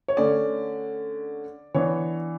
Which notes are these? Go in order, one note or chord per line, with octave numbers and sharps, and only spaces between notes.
C#5
D3 A3 C#4 D5
E3 B3 D4 C#5